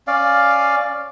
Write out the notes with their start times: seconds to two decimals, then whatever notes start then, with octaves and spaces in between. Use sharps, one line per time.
0.07 C#4 D5 F5